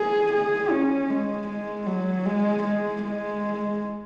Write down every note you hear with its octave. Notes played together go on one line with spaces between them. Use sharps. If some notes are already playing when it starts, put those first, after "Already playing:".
Already playing: G#4
G#4
C#4
G#3
G#3
F#3
G#3
G#3
G#3